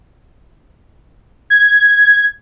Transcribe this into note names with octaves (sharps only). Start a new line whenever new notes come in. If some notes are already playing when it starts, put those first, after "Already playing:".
G#6